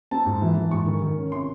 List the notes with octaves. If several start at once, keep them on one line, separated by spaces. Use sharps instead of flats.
C4 A5
G#2
E3
E3
G#2 C#6
D#3
D#3
C#4
C3 C6